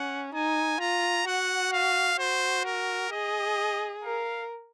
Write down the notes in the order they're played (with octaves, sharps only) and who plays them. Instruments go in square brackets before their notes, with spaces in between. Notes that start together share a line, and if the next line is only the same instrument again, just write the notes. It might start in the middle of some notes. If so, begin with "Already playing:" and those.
Already playing: [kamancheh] C#4 [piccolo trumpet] F#5
[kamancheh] D#4 [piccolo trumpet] G#5
[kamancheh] F4 [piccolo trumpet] A#5
[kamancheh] F#4 [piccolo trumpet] F#5
[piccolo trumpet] F5
[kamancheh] F#4 [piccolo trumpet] C5
[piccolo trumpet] A#4
[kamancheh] G#4 [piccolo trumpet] D#5
[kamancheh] A#4 [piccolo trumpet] F5